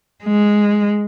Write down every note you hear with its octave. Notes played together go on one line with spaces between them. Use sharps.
G#3